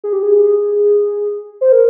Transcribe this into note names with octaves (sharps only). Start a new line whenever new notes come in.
G#4
G4
G#4
C5
A#4